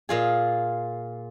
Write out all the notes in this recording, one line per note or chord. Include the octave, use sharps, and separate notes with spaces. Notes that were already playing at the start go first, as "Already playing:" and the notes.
A#2 F4 G#4